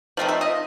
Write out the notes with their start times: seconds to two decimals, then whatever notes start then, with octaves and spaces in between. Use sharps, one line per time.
0.17 F3 A3 C4 D#4
0.28 E5
0.41 D#5